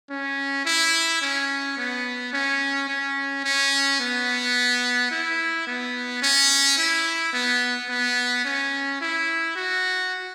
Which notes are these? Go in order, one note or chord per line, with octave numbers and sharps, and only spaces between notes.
C#4
E4
C#4
B3
C#4
C#4
C#4
B3
E4
B3
C#4
E4
B3
B3
C#4
E4
F#4